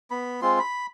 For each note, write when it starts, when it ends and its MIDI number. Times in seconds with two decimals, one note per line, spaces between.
0.11 0.40 59
0.11 0.40 83
0.42 0.59 56
0.42 0.59 60
0.42 0.59 65
0.42 0.59 84
0.59 0.86 83